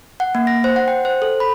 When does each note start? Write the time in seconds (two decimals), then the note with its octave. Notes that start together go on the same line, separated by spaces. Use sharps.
0.20 F#5
0.35 A#3
0.47 A#6
0.64 C5
0.76 F#5
0.88 G5
1.05 C5
1.22 A4
1.40 B5